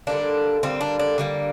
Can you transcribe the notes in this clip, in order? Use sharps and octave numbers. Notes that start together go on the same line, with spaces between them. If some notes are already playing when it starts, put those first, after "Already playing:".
D3 G3 A#3 D4
D3 G3 A#3 C4
D4
D4
D3 G3 A#3